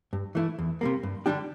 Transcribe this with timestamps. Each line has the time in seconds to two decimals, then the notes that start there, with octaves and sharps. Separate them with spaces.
0.13 G2
0.35 E3 A3 E4
0.59 E2
0.81 C3 G3 A#3
1.03 G2
1.26 D3 G3 D4 G4